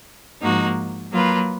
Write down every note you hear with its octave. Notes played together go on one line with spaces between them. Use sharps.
G#2 F3 A#3 D#4 F#4
F#3 A#3 F4 B4